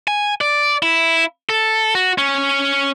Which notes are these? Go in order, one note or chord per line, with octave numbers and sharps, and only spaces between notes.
G#5
D5
E4
A4
F#4
C#4